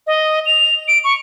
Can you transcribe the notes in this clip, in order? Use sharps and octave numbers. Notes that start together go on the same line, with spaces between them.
D#5
F7
D7
C#6